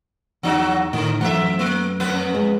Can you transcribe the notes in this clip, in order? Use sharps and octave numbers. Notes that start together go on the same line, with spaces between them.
E2 F3 F#3 D#4 F#4
A2 D3
F#2 E3 A3 E5 F#5
A#3
F2 B3 B4
G#3